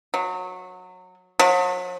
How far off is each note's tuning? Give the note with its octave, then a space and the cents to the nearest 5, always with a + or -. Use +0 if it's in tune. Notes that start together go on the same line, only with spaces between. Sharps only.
F#3 -20
F#3 -45